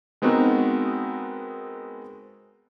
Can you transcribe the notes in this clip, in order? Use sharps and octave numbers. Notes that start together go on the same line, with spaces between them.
G#3 B3 C4 D#4 F#4 A#4